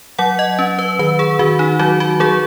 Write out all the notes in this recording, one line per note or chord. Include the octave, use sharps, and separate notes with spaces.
F#3 F#5
D#5
C#4
B4
D#3 B4
G#4
D#3 F#4
D#4
F#3 F#4
F#4
F#3 G#4